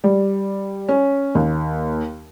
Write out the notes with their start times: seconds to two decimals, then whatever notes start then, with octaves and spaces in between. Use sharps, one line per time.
0.04 G3
0.89 C#4
1.35 D#2